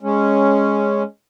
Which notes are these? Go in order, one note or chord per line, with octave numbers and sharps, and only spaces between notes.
G#3 C#4